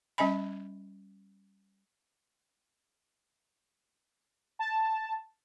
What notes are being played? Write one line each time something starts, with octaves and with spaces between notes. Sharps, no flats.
G3 C#4 D#5 G#5 B5
A5